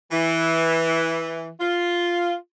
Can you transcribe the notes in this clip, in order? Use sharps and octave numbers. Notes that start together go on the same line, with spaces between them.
E3
F4